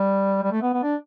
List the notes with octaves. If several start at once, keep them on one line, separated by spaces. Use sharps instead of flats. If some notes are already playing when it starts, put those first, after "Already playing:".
Already playing: G3
G3
A3
B3
B3
D4